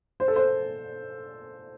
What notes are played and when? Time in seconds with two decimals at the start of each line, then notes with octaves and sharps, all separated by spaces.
0.20 C5
0.28 A4
0.36 C5